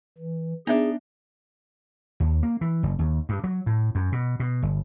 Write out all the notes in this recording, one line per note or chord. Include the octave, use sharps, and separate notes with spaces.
E3
B3 D4 D#4 G#4 E5
D#2
A#3
E3
F#1
D#2
G2
F#3
A2
F#2
B2
B2
G1